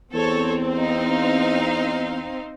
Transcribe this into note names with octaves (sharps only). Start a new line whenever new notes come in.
E2 C4 A4 C#5
D#4 F5